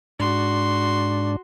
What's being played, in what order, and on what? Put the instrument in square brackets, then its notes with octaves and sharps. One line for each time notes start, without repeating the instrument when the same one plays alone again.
[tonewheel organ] G#2 D4 [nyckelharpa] F#4 C6